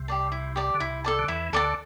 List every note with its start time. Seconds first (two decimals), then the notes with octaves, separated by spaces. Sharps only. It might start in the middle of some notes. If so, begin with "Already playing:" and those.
Already playing: C2 C3
0.08 G4 D5 A5
0.32 E4
0.56 G4 D5 A5
0.74 D3
0.80 C2 C3 E4
1.04 A4 D5 A5
1.19 D3
1.28 E2 E3 E4
1.52 D2 D3 A4 D5 A5